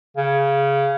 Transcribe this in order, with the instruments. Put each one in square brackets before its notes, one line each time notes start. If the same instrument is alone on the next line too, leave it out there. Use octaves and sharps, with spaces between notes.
[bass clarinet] C#3